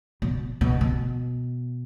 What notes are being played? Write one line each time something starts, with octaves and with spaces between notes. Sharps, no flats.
B2
B2
B2